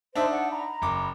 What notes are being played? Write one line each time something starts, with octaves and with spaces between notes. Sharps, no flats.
D4 D#4 C5 E5 A5
D5 F#5
A#5 B5
F#1 D6